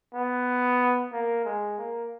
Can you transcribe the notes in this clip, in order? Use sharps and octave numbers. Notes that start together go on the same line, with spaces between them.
B3
A#3
G#3
A#3